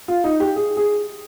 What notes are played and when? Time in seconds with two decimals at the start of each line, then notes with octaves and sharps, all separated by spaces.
0.08 F4
0.24 D#4
0.40 G4
0.56 G#4
0.77 G#4